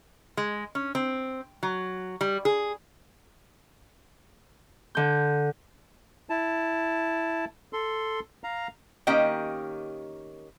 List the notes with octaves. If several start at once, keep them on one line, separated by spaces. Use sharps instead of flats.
G#3
C#4
C4
F#3
G3
G#4
D3 G6
E4 A5
A4 C6
F5 A#5
D#3 A#3 C#4 G4 D#5 G5